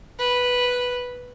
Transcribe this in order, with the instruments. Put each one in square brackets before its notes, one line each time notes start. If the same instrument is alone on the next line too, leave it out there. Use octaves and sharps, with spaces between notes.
[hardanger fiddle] B4